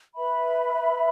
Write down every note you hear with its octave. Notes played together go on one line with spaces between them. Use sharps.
B4 E5 B5